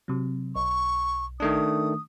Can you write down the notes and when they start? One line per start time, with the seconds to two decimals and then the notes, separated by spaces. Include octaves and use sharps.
0.08 C3 F#3
0.55 B1 C#6
1.40 D#3 A3 D4 D#6